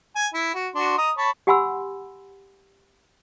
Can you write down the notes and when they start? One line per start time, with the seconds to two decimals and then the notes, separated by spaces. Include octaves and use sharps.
0.16 G#5
0.34 E4
0.54 F#4
0.75 D4 F#4 C6
0.98 D#5 A#5 D#6
1.17 C#5 A5 B5
1.47 G4 F#5 G#5 B5 C6 E6